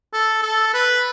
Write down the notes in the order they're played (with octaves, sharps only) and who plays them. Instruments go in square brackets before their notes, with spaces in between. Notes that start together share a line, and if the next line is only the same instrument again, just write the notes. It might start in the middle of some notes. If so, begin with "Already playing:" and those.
[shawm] A4
A4
B4